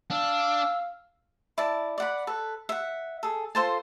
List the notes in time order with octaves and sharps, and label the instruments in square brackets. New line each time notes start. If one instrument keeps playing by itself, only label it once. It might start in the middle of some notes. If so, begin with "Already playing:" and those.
[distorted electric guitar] D4 [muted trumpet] F5 [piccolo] E6
[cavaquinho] E4 D5 A5
D5 F#5 B5
A4 B4
E5 F#5
G#4 A4
F4 A4 C5 A5